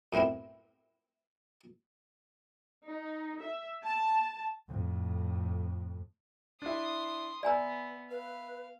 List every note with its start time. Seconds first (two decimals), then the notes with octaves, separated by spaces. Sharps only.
0.13 F#2 A2 B3 C4 E4
2.87 D#4
3.41 E5
3.83 A5
4.68 F2 A2
6.62 D4 E4 C6 D#6
7.43 B3 D5 E5 G#5 A#5 E6
8.11 B4 F5